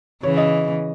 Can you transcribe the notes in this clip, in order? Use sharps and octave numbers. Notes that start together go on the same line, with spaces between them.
C#3 E3 C#5
D#5